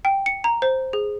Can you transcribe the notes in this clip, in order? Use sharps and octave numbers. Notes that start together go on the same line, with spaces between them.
G5
C#7
A#5
C5
G#4